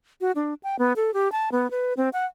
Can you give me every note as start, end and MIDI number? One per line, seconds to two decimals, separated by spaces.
0.21 0.32 66
0.35 0.54 62
0.63 0.76 79
0.79 0.93 59
0.96 1.13 69
1.14 1.31 67
1.32 1.49 81
1.52 1.70 59
1.71 1.93 71
1.97 2.09 60
2.13 2.25 78